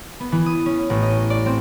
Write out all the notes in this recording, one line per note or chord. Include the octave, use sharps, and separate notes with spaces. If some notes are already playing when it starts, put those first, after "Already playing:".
B3
E3
D#6
C#4
A1
D#5
D5
C4